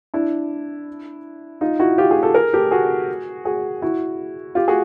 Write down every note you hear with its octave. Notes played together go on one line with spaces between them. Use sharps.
D4 E4
D#4 F4
E4 F#4
F4 G4
F#4 G#4
G4 A4
G#4 A#4
G4 A4
F#4 G#4
F#4 G#4
E4 F#4
F4 G4
F#4 G#4